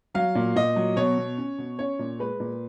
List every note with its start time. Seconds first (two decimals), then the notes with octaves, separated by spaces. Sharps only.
0.14 F#3 F5
0.35 A#2
0.56 A#2 D#5
0.76 F#3
0.96 B2 C#5
1.18 B2
1.38 C#4
1.58 B2
1.79 C#4 C#5
1.99 A#2
2.19 G#3 B4
2.40 A#2